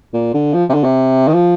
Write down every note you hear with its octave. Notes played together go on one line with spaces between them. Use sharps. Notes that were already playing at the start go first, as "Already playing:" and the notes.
A#2
D3
F3
C3
D3
C3
D#3
F3